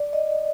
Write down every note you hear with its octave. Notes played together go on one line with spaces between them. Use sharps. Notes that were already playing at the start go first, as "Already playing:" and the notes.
Already playing: D5
D#5